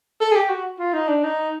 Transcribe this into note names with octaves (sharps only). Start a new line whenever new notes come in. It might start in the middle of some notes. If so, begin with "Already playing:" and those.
A4
G#4
G4
F#4
F4
D#4
D4
D#4